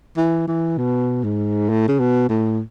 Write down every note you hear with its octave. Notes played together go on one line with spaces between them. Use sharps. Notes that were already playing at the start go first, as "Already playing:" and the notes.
E3
E3
B2
G#2
A2
C#3
B2
A2